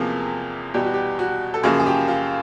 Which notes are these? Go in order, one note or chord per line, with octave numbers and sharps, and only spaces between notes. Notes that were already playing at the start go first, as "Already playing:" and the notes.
Already playing: E2 C3 F3 A#3 G#4
E2 B2 G3 G4
F#4
G4
F#4
A4
F#2 C#3 F3 A#3 G#4
G#4
G4
F4